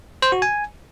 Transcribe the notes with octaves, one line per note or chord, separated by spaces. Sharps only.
C5
F#4
G#5